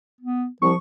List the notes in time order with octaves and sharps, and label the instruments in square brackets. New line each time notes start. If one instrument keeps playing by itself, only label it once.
[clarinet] B3
[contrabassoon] C2 [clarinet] F3 [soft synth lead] C#6